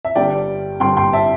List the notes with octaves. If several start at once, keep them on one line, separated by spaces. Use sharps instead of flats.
E5
G1 G2 D3 G3 D5 G5
G1 G2 D3 G3 G5 C6
G5 C6
E5 A5